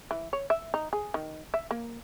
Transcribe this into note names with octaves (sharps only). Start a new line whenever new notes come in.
E3
C#5
E5
D#4
G#4
D#3
E5
A#3